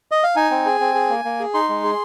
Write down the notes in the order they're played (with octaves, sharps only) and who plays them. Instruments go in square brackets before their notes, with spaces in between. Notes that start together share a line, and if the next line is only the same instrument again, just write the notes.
[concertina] D#5
F5
D#4 G#5
C4
G#4
C4
G#4
A#3
A#3
G#4
D#4 C6
G#3
G#4